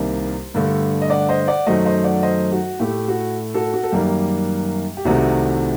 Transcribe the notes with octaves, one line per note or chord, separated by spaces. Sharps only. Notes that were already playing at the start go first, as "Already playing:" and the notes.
Already playing: C2 C3 D#3 G3 A#3 C5
G2 D3 A3
D#5
D5 F#5
C5 D#5
D5 F#5
F#2 D#3 F#3 A3 C5 D#5
C5 D#5
D5 F#5
C5 D#5
F#4
A2 A3 G4
F#4
F#4 A4
F#4
A4
F#2 D#3 G3 A#3 G4
G4
C2 C3 D#3 A3 F#4